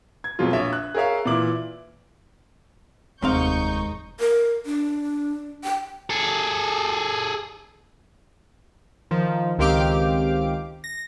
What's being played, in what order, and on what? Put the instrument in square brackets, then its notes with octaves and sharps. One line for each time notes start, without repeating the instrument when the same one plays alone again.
[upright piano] G#6
F2 B2 F#3 G#3 F4
A#1 C#5 E5 E6
F#6
G#4 A#4 C#5 E5 F5
A#2 E3 E4 D6 F#7
[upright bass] F1 [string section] D#2 C#6 G6 [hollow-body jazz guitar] G#2 C4 F5 [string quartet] D#4
[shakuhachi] A#4
D4
G5
[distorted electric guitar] G#4 A4
[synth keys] D#3 F3
C#2 D#3 C4 G4 F5 D6
A#6